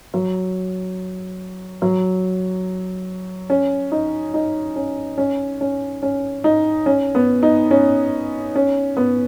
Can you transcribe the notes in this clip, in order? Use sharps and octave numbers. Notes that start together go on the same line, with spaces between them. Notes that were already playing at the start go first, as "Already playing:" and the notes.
F#3
F#3
C#4
D#4
D#4
C#4
C#4
C#4
C#4
D#4
C#4
B3
D#4
C#4
C#4
B3